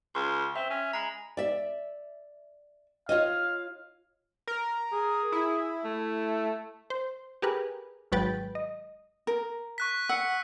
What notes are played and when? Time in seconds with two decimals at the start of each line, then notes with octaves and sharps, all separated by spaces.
0.15 C#2 C6 C#6
0.56 C4 E5
0.70 C#4
0.93 G#3 A#5 B5
1.37 D5 E5
3.09 F4 C#5 D#5 F5
4.47 A#4
4.93 G#4
5.32 E4
5.85 A3
6.90 C5
7.42 G4 G#4 A#4 B4
8.12 G#1 F#3 G#3 B4 G5 A6
8.55 D#5
9.27 A#4
9.78 C#6 F#6 B6
10.09 F#5 E6 C#7